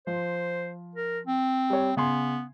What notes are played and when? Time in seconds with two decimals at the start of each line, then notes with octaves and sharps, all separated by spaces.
0.07 F3 C5
0.96 A#4
1.27 C4
1.70 G3 C#5
1.97 C#3 B3 G#5 C6